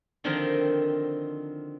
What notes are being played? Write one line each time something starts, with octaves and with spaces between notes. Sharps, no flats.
D3 D#3 F3 C4 D#4 A#4